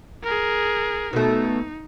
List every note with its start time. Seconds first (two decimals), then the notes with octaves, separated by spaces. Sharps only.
0.24 G#4 A#4
1.13 B2 A3 D#4